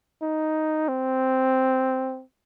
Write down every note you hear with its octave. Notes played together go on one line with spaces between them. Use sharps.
D#4
C4